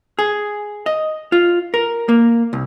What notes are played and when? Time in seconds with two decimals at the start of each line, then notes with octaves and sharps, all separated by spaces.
0.19 G#4
0.86 D#5
1.32 F4
1.74 A#4
2.09 A#3
2.53 C2